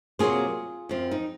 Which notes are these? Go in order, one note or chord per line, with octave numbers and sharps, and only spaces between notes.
C3 F#3 A#3 F4 G#4
F#2 F3 C4
D#4